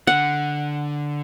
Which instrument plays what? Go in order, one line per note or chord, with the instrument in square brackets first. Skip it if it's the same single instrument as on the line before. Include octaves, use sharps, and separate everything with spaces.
[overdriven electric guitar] D3 [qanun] F#5